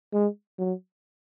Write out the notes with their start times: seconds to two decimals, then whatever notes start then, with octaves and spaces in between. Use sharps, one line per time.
0.13 G#3
0.59 F#3